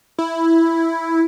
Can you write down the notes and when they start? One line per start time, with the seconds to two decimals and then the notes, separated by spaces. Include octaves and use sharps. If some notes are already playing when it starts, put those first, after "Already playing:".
0.18 E4